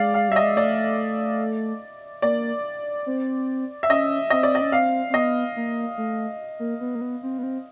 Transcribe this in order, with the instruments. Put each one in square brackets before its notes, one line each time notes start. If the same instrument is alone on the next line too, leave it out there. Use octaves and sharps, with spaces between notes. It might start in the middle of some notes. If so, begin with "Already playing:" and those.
Already playing: [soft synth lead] G#3 [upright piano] D5 F5
[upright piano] F5
[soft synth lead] G3 [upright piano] E5
[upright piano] D#5
[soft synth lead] G#3
[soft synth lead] A3 [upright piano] D5
[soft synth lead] A#3 [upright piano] D5
[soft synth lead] C4
[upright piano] E5
[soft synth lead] C#4 [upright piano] D#5
[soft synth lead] C4 [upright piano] D#5
[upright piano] D5
D#5
[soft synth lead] C#4
[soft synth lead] C4 [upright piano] F5
[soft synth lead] C4
[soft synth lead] B3 [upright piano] D#5
[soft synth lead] A#3
A3
A#3
B3
A#3
B3
C4
B3
C4